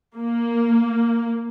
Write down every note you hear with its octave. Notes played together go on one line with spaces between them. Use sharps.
A#3